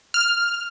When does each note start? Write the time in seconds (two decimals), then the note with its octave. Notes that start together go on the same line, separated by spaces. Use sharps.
0.14 F6